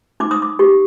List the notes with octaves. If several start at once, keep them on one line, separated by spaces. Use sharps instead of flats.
D#4 D6
D#6
D6
G4